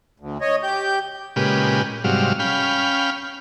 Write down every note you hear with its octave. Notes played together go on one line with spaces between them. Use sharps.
D2
C#5 D#5
G4 G6
A#2 C#3 G#3 G4 B4
G#2 C3 F#3 G3 F5
C#4 F5 G5 B5